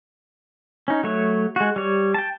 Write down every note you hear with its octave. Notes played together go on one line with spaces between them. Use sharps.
C#4 D#4
F#3 A3 C#5
G#3 F#4
G3 C#5
G5 A5